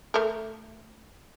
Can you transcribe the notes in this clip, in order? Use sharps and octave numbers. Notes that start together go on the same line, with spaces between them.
A3 A#4